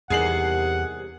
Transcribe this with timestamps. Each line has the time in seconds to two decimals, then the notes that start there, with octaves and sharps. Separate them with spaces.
0.10 E2 C3 D#3 G3 G#4 F#5 C7 F#7